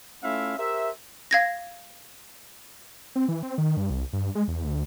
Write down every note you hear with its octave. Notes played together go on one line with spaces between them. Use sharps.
A3 C#4 E4 F4 E5 F5
G4 A#4 C5 E5
F5 G#6 A#6
C4
E3
C4
D#3
G2
C2
G2
G#3
E2
D2